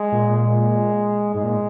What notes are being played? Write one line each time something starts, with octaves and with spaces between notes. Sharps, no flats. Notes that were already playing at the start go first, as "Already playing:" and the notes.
Already playing: G#3
A#2
G#3
G#2 G#3
A#2